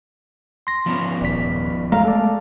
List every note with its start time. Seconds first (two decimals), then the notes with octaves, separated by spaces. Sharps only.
0.67 C6 A#6
0.86 F3 B3 C#4
1.22 D#1 D5 B6
1.92 G#3 A3 F5 A#5
2.05 A4 D5